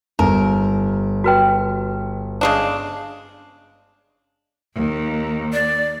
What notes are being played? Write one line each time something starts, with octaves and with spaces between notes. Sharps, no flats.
G1 D#4 A#4
F#4 B4 G5
C#3 G#3 D4
D#2
D5